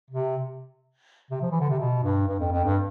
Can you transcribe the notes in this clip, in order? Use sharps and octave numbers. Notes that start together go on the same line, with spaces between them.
C3
C3
F3
E3
D3
C3
B2
G2
G2
F2
F2
G2